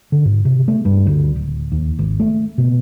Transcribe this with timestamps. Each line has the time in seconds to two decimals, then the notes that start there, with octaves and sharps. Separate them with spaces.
0.12 D3
0.25 G#2
0.45 C3
0.68 A3
0.85 G2
1.06 D2
1.36 D1
1.72 D#2
1.99 G#1
2.20 A3
2.58 B2